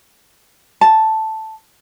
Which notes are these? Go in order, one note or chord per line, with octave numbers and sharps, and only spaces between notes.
A5